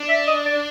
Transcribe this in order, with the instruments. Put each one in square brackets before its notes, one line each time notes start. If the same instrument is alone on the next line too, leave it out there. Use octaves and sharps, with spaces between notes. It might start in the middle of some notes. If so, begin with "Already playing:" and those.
Already playing: [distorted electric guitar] D4
[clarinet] E5
D#5
D5